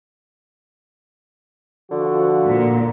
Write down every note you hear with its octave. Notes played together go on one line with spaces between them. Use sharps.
D3 F3 F#4
A#2